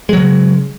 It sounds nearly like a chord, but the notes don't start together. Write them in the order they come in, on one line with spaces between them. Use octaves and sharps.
G#3 F#3 C#3